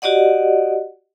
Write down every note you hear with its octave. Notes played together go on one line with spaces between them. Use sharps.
F#4 G4 D5 D#5 F#5